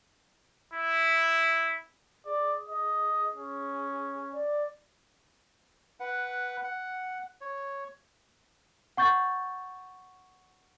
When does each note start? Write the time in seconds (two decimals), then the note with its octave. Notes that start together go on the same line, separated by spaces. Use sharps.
0.73 E4
2.26 G#4 D5
2.69 D#5
3.33 C#4
4.33 D5
6.00 B4 F#5
6.64 F#5
7.41 C#5
8.97 F#5 C#6 G6 A6